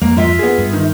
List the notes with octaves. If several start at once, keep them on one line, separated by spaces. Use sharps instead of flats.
F2 A#3
F4 E5
B3 G#4
G2
D#3